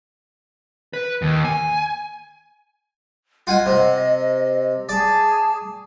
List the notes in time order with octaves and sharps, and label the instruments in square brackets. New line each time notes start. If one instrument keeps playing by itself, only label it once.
[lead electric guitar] B4
D#2
G#5
[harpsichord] F4 F#5 G#5 [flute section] D#5
[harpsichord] C3
[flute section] G#4 A5 [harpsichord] D5